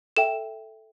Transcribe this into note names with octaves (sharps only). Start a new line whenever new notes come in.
A4 E5 G5 E7